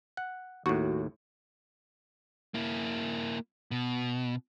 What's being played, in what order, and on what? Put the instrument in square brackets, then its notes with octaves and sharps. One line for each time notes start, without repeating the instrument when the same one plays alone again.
[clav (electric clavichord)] F#5
[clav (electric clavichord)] D#2 A2 [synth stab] F#4
[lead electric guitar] A#3 E4
B2